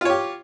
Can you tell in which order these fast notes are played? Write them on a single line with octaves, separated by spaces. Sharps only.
F4 C#5 G4